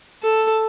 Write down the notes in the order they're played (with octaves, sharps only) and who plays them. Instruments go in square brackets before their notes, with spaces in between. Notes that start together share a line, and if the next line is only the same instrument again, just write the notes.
[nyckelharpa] A4